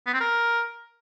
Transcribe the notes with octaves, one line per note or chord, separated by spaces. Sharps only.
B3
C4
A#4